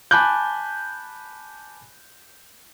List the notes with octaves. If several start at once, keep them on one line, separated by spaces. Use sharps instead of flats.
G#5 A5 B5 D6 F#6 G6